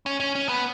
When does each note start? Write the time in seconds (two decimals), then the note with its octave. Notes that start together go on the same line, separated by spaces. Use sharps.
0.06 C#4
0.20 C#4
0.35 C#4
0.49 B3